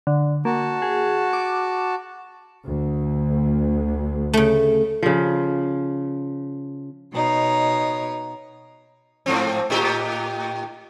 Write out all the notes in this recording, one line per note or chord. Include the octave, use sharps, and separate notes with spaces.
D3
A#3 F#4 A5
G#4
D6
D2
C#3 A3
C#3 F3
B2 D#4 C#5
G#2 F3 C4
A2 D#4 G4